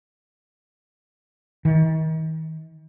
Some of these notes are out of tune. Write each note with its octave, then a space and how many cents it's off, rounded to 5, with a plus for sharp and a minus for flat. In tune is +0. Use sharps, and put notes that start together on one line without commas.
D#3 +40